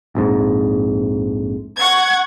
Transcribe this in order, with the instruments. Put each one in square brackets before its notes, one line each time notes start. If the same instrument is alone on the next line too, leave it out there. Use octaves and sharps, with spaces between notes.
[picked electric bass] A#1 F2 G#2
[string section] F#5 C#6 G#6